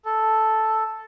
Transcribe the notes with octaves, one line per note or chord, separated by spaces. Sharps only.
A4